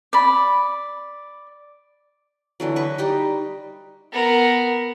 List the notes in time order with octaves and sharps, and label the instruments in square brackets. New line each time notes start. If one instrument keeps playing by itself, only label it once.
[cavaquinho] D5 B5
[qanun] D3 E3 F#3
B4 D#5 C#6
G3 D#4 G4
[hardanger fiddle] B3 A#4